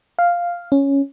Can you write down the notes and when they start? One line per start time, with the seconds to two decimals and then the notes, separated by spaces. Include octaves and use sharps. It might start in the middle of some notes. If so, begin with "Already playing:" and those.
0.19 F5
0.72 C#4